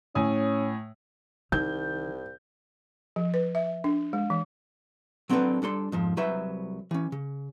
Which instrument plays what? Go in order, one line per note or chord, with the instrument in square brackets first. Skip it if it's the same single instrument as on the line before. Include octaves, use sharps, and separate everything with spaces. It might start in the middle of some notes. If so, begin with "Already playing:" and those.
[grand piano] A2 G#5 D#6 [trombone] C#4
[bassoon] C2 [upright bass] D#3 [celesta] D#4 [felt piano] G6
[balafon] F3
B4
E5
D4
G#3
E3
[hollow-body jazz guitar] F#3 C4 D4 F4 A4 B4
G3 D4 A4 C6
F2 G#2 F3
C2 F#3 B4 C5 E5
E3 C#4
C#3